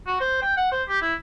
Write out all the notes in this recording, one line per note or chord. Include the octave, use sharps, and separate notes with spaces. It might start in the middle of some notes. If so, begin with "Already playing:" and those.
F#4
C5
G5
F#5
C5
G4
E4